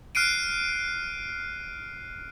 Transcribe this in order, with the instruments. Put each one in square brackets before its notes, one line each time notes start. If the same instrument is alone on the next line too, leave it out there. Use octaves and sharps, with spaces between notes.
[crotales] F6 F#6 C7 D7 D#7